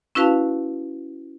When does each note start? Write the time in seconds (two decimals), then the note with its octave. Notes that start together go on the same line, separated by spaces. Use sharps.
0.15 C#4 E4 F#4 B4 F5 A5